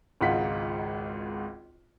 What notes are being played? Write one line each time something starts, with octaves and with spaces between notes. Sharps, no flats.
G#1 C#2 G#2 F4 F#5 B6